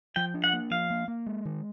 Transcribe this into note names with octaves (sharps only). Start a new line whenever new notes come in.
F3 G5
D4
F#5
A#3
F3 F5
A#3
A#3
G#3
D#3